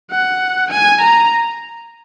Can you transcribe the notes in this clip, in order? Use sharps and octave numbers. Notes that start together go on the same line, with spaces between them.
F#5
G#5
A#5